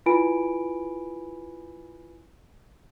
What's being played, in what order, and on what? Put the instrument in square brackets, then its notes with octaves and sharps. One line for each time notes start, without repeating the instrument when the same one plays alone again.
[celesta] E4 F4 B4 G#5 B5 D7